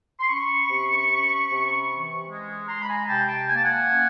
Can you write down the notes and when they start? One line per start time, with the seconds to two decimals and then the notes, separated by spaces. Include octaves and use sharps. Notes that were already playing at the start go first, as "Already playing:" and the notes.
0.20 C6
0.29 C#4 B5 C#6
0.70 C3
1.10 C#4
1.49 C3
1.90 E3
2.29 G#3
2.68 G#3 A#5 C6
2.82 B5
2.89 G#5 A#5
3.08 C3 G5 A5
3.28 G5 A5
3.48 A#3 G#5
3.56 A5
3.64 F#5 G#5
3.89 C#4